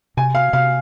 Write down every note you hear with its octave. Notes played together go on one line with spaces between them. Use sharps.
C3 G#5
F5
C3 F5